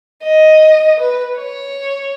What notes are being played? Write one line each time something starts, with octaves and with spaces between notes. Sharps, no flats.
D#5
B4
C#5